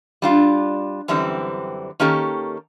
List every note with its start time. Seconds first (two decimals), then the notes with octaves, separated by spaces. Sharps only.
0.22 G3 D4 F4
1.08 F#2 D3 E3 G3 C4
2.00 D#3 A#3 C#4 G4 A4